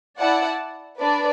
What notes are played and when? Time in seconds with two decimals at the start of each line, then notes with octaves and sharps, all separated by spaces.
0.18 E4 D5 F#5 A5
0.99 D4 B4 D5